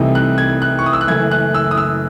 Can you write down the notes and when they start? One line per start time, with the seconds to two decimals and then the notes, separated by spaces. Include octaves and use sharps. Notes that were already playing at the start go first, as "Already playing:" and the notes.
Already playing: C2 C3 E3 A3 D#4
0.15 F#6
0.38 G#6
0.62 F#6
0.79 C#6
0.86 D#6
0.93 E6
1.01 F#6
1.08 F#1 F#2 E3 A3 G#6
1.31 F#6
1.54 E6
1.71 D#6
1.77 E6